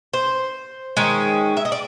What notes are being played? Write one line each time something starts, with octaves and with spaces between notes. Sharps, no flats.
C5
D#3 G#3 C#4
E5
D#5
D5